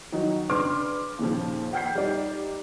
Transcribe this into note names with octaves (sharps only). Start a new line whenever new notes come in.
D#3 F#3 D#4 F#4
C#3 D4 B4 C6 D6 F6
D#2 A#2 C#3 F3
F#5 G5 F6 G6 B6 C7
G3 D#4 D5